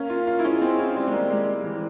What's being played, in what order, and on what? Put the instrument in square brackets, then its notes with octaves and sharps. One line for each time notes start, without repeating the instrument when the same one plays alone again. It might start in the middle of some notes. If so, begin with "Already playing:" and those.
Already playing: [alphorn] A#3 [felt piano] C#4
[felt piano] F4
F4
E4
[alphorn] G#3 [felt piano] C#4
[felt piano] C4
E4
[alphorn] G3 [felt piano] C4
[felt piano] G#3
A#3
G#3
[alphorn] G3
[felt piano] E3